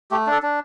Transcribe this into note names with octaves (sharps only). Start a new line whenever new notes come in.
A3 G4
D4 A4
D4